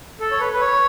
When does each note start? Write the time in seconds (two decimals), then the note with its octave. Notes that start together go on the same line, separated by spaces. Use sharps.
0.20 A4
0.31 C#5
0.40 B4
0.53 B4
0.61 C#5